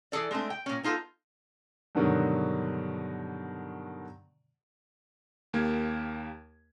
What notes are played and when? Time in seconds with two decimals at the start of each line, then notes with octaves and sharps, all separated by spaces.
0.12 E3 G#4 A4 D5
0.31 G#3 A3 C4 D4
0.50 G5
0.66 A#2 C#4
0.83 B3 D#4 F4 G#4 A4
1.95 G2 B2 D3 D#3 F#3 G#3
5.53 D#2 A#3 G4 G#6